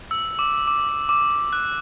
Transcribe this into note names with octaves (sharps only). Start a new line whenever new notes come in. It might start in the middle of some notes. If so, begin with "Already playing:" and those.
E6
D6
D6
D6
D6
F#6